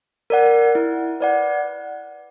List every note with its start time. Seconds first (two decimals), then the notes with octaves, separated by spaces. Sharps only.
0.30 A#4 D5 F#5
0.75 E4
1.20 B4 D5 F#5